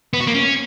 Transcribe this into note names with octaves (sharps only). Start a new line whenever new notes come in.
B3
F#4
A#3
C#4